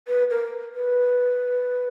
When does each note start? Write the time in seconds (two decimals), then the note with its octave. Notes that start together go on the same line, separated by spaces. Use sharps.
0.08 B4
0.30 A#4
0.75 B4